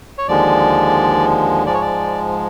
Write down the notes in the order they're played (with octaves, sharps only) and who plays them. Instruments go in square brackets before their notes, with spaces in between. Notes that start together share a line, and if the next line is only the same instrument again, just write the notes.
[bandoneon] C#5
D#2 D3 F3 G#3 D5
G#2 F3 G#3 D5
C#5
D5